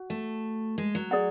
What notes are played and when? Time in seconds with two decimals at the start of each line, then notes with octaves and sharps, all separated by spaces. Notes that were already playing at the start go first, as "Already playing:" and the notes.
Already playing: F#4
0.10 A3
0.78 G#3
0.95 F#3
1.11 G#4 D5 F#5